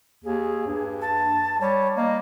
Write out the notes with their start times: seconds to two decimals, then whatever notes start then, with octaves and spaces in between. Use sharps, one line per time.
0.24 D#2 G#4
0.67 G2
1.02 A5
1.61 G3 C#5
1.97 A#3 D#5